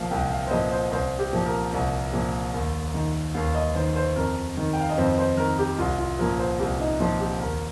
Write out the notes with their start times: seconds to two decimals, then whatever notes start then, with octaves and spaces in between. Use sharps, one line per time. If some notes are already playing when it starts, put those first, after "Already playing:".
Already playing: C2 A#2 F3 F5
0.11 C2 G5
0.31 F5
0.47 C5
0.51 A#2 F3 D#5
0.71 C5
0.91 C2 C5
1.19 G4
1.33 A#2 F3
1.46 A#4
1.73 C2
2.13 A#2 F3
2.54 D#2
2.94 D#3
3.35 D#2 F5
3.55 D#5
3.75 D#3 C5
3.96 C5
4.16 F2 A#4
4.57 D#3
4.73 G5
4.81 F5
4.89 D#5
4.98 F2 C5
5.18 C5
5.37 D#3 A#4
5.59 G4
5.78 C2 F4
5.99 F4
6.19 A#2 F3 A#4
6.39 C5
6.59 C2 G4
6.79 D#4
7.00 A#2 F3 F4
7.20 G4
7.40 D#2 A#4